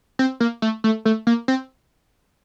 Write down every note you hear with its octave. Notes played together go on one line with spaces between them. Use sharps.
C4
A#3
A3
A3
A3
A#3
C4